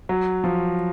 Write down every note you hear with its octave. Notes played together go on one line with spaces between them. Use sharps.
F#3
F3